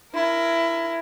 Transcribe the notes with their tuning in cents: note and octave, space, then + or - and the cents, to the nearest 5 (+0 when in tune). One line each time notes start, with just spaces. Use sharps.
E4 +20 A#4 +0